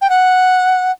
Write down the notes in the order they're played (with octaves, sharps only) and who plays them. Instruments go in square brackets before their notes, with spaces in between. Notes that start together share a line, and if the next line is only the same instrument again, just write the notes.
[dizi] G5
F#5